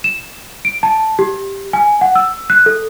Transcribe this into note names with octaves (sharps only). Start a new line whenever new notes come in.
E7
D7
A5
G4
G#5
F#5
E6
F#6
A4